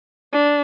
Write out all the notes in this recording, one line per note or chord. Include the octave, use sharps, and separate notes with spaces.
D4